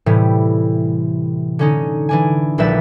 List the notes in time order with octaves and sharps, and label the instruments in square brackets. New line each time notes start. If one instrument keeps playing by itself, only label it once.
[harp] A2 C3 E3 G3
D3 C#4 D#4
E3 D4 G#5
D#1 A#1 G3 B4 E5 A6